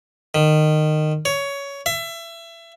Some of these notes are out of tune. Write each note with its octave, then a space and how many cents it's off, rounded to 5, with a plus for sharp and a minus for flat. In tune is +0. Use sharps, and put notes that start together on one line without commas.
D#3 -20
C#5 +15
E5 +25